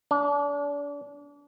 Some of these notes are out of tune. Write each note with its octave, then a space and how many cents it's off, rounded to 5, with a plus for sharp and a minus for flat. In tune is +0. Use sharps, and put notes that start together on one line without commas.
D4 -35